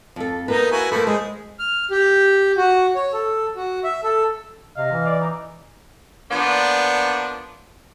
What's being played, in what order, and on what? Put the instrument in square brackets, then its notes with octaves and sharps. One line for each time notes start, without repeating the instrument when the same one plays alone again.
[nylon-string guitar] F2 A4
[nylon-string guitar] A#3 B4 [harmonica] B3 D#4 A#5
[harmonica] E4 F#4 G#5
[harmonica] F3 A3 B5 [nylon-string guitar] A#3 A4
[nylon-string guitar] G#3 C5 [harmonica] G#4
[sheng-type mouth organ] F6
G4
F#4
C#5
A4
F#4
E5
A4
[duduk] C3 [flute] D#5 [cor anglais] F5
[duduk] E3
[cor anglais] D5
D#4
[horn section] F3 A#3 B3 D4